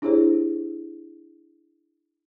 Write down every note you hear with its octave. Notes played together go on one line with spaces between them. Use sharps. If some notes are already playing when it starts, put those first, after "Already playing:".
D4 E4 G4 G#4 C5 C#5